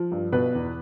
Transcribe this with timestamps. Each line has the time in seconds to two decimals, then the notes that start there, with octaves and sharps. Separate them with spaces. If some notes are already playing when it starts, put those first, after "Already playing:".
Already playing: F3
0.12 G2
0.32 B2 B4
0.55 E2